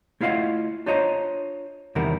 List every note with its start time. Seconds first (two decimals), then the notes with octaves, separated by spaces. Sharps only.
0.21 A3 E4 F4 D#5 F5 F#5
0.86 D4 F4 C5 C#5 D#5 A#5
1.95 E2 C3 D#3 G3 A#4 F#5